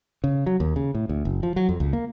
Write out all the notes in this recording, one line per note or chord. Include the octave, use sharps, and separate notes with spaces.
C#3
F#3
D#2
C#3
A2
D2
F#1
F3
F#3
F2
C#2
A#3